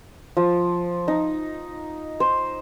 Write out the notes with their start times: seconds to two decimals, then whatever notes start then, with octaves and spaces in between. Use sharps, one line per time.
0.37 F3
1.08 D#4
2.20 C5